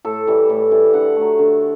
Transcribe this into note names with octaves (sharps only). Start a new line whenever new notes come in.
A2 A4
E3 G3
A2
E3 G3
D3 F#5
F#3 A3
D3